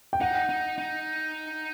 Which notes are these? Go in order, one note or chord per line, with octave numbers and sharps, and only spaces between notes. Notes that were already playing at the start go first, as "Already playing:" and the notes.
G5
D#4 F#5
D#4
D#4